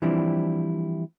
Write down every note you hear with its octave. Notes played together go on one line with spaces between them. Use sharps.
E3 F3 G3 C4 D4 E4